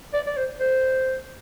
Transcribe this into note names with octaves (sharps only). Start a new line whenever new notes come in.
D5
D5
C5
C5